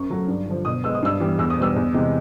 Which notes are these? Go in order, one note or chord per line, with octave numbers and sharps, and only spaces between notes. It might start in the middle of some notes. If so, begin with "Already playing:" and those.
Already playing: F#2 C#6
C#3 F#3 A3
G2
D3 F3
B2 D#6
G#3 B3 E6
D#6
G2 E6
E3 G3 B3
E2 E6
D#6
B2 G3 B3 E6
E2
C3 E3 G#3